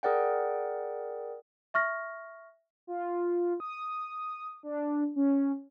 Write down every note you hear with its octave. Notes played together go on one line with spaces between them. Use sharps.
G#4 A#4 D5 F#5 G5
E5 C#6 F6 A#6
F4
D#6
D4
C#4